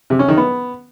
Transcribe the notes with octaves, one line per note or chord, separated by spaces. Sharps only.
C3
C#4
D#3
B3